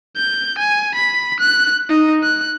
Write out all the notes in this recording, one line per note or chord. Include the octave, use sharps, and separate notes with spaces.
G6
G#5
B5
F#6
D#4
F#6